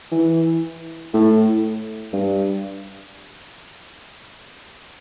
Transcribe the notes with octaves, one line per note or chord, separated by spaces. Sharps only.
E3
A2
G2